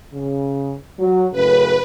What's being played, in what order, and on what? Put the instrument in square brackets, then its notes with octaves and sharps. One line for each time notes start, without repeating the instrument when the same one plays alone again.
[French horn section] C#3
F#3
[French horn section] F#2 A2 C#3 [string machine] B4